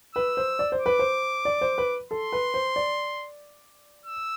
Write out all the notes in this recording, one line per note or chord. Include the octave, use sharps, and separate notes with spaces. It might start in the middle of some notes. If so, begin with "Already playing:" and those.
B4 E6
C5
D5
C5
D6
B4
C5
D5
C5
B4
A4 C6
B4
C5
D5
E6